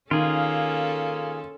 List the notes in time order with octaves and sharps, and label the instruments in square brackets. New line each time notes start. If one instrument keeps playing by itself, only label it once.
[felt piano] D#3 [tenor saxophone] A#3 [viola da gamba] C#4 A4 [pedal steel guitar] F4 G#4